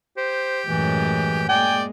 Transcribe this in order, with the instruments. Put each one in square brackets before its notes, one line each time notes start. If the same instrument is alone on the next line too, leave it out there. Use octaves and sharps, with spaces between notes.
[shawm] G4 [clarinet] C5
[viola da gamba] F#2 A2 G#3 [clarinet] E3
[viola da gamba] G#3 A#3 [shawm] D5 [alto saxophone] G5 [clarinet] G#5